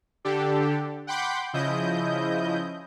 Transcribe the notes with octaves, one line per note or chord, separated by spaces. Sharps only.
D3 D4 G4 A4
F#5 G5 B5 C6 D6 G6
C#3 F3 E4 D#5 G6